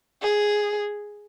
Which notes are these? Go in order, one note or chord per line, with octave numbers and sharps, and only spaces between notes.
G#4